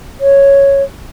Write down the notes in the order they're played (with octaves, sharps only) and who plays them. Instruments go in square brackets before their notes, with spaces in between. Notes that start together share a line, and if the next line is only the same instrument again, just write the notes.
[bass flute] C#5